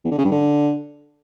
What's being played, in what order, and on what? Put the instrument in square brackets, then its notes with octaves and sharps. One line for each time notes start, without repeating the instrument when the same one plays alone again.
[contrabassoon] E2
D3
C#3
G2
D3